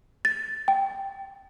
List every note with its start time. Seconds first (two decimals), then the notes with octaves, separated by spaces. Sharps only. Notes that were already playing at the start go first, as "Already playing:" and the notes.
0.25 A6
0.68 G5